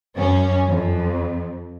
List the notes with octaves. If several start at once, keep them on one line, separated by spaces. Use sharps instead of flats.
F#2 C#4
F2